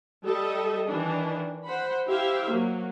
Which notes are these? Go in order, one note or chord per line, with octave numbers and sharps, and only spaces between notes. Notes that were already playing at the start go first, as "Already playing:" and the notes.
G3 A4 D#5 E5
D#3 E3 D4
C5 F#5 B5
E4 G4 C5 E5 F5
F#3 A#3